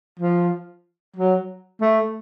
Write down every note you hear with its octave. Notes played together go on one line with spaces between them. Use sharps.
F3
F#3
A3